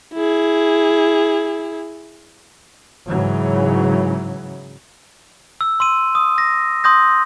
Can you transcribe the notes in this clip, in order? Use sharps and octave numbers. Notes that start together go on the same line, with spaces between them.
E4 G#4
G#2 C#3 E3 F#3
E6
C6 E6 D#7
D#6
A#6
C6 D#6 G6 A#6